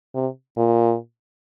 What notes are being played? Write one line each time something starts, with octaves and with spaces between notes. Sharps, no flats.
C3
A#2